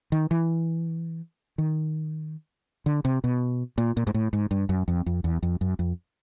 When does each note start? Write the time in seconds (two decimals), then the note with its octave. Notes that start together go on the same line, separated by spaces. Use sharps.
0.12 D#3
0.31 E3
1.58 D#3
2.86 D3
3.05 C3
3.24 B2
3.78 A#2
3.97 A#2
4.07 G#2
4.14 A2
4.33 G#2
4.51 G2
4.69 F#2
4.88 F2
5.06 F2
5.24 E2
5.43 F2
5.61 F#2
5.79 F2